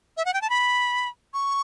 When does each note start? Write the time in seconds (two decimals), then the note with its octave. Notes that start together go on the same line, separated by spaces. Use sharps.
0.17 E5
0.25 F#5
0.34 G5
0.41 A5
0.50 B5
1.34 C#6